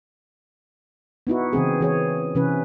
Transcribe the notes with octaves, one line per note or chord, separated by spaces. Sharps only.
B3 D#4 E4 F#4
C#3 E3 C4 G#4
E3 G#4 C#5
C3 E3 C#4 B4